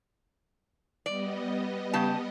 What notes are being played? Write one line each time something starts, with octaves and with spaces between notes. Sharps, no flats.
G3 B3 D5 D#5
C#3 G4 A5